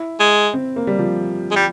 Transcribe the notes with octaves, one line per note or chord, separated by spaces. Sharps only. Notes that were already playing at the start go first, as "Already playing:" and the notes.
Already playing: E4
G#3
C4
A#3
G3
F3
G#3
G3